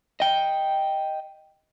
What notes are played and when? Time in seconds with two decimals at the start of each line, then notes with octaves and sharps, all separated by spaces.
0.20 D#5 G5